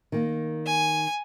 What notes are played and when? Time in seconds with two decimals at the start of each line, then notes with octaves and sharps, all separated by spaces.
0.12 D#3 A#3
0.66 G#5